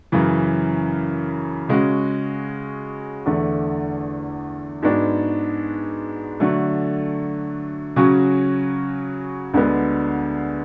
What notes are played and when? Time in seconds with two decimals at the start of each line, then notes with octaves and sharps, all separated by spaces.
0.12 F#2 C#3 E3
1.69 C#3 G#3 C#4 F#4
3.26 E2 D3 A3
4.82 G#2 G#3 B3 D4 F#4
6.40 D3 F#3 A3
7.96 C#3 F#3 C#4 F#4
9.54 D2 D3 G#3 B3